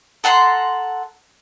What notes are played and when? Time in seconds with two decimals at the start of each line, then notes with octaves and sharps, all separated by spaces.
0.24 A4 F#5 A#5 C6